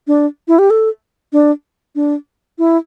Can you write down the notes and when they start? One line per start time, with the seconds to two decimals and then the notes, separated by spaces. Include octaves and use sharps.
0.07 D4
0.48 E4
0.59 G4
0.70 A4
1.33 D4
1.95 D4
2.58 E4